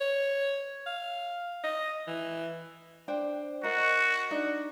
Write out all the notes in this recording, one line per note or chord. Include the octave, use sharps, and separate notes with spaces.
C#5
F5
D#5
E3
D4 C5 G5
F#4 A#4 D#5
D4 D#4